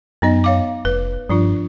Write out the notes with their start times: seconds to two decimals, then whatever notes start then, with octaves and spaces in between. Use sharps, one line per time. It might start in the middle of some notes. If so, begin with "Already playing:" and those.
0.22 F#2 B3 D#4 D#5
0.44 C#5 F5 D6
0.85 F1 B4
1.29 G2 F3 D4 F4